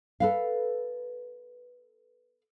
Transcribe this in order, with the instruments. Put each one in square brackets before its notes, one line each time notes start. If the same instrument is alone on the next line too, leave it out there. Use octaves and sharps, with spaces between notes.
[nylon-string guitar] A4 B4 F5